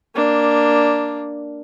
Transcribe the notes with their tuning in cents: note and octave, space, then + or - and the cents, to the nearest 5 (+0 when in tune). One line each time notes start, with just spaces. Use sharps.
A#3 +0 D4 +0